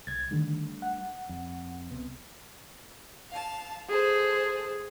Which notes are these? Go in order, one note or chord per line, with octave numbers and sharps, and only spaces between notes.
C2 G#6 A6
D3 D#3 G3 A3 D4
F#5
F2
C2 C3 B3
F5 A5
G#4 A4 C5